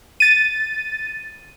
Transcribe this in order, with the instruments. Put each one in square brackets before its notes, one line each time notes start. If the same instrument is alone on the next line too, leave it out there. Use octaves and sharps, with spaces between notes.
[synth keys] A6 D#7